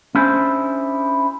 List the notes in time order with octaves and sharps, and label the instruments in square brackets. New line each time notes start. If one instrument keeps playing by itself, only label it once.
[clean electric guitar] C#4 D4 E4 G#4 C5